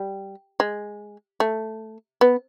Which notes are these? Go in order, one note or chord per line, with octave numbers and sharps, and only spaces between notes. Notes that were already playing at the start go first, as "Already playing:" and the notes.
Already playing: G3
G#3
A3
B3